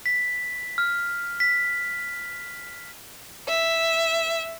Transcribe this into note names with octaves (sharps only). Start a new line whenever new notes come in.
B6
F6
B6
E5